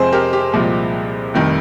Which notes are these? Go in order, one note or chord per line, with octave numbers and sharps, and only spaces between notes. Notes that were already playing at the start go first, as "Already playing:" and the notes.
Already playing: F2 C3 F3 G#3 G#4 C5
G4 A#4
G4
C2 A#2 F3 G#3
F1 F2 D#3 G3